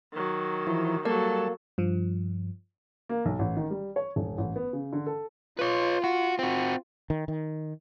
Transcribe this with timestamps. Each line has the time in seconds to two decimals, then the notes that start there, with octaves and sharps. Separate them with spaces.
0.13 D#3 F#3
0.67 E3 F3 E4
1.05 F#3 G3 A#3 A4 A5
1.78 G2 F3
3.09 A#3
3.25 B1
3.39 A1
3.57 D#3
3.71 G3
3.96 C#5
4.16 D#1
4.38 A1
4.56 B3
4.73 C#3
4.93 D3
5.07 A4
5.59 F4 B4 C#5
6.04 F#4
6.39 C4 F#4
7.10 D#3
7.28 D#3